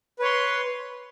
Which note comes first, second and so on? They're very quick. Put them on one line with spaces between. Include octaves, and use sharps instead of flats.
B4 C#5 C6